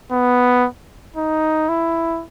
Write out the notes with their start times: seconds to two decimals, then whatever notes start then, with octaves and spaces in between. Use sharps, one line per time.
0.12 B3
1.16 D#4
1.69 E4